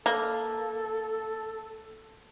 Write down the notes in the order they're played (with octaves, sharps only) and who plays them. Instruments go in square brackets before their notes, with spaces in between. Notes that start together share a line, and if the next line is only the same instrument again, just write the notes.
[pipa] A#3 [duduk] A4